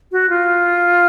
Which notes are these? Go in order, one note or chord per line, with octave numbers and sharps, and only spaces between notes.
F#4
F4